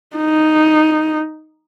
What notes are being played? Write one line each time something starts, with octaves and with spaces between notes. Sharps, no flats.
D#4